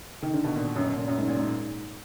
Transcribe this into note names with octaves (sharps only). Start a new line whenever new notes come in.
D#3
D3
B2
A#2
F#2
A#2
F#2
G#2
A#2
G#2